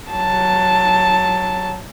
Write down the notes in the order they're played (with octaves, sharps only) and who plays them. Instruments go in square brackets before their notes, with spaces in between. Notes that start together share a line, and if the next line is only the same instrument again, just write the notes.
[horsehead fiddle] F#3 A5